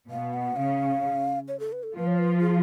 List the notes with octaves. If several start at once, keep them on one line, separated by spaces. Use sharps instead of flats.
B2 B3 F5
F#5
C#3 C#4 F5
C#5
A4
B4
A4
F3 F4 B4
C#5
B4
G#4